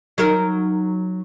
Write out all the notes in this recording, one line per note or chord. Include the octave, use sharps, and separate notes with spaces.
F#3 D#4 A#4